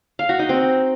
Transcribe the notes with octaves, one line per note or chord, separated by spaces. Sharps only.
F5
F#4
D#4
C4